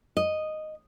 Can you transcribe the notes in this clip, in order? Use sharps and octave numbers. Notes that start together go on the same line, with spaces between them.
D#5